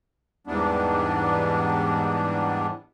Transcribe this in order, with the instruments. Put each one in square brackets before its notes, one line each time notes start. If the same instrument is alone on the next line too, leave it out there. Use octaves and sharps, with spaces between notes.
[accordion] E2 G#2 E3 G3 B3 D4